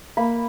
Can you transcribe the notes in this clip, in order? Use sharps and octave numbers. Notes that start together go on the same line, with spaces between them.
A#3 B5